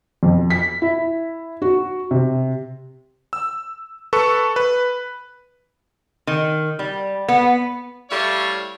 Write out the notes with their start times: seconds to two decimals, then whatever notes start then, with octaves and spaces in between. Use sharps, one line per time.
0.23 F2
0.50 B6
0.82 E4
1.62 F#4
2.11 C3
3.33 E6
4.13 A4 B4 C#6
4.56 B4
6.27 D#3
6.79 G3
7.28 B3
8.10 G3 A3 E4 C#5 F5